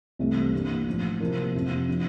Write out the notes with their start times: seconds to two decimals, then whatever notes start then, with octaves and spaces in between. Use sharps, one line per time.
0.19 C2 C3 E3 A3 C4
0.53 G2 E3 G3 A#3 D4
0.87 A1 A2 F3
1.20 C3 F3 A#3 E4 A#4
1.55 F2 C3 F3 C4 E4
1.88 F3 A#3 D4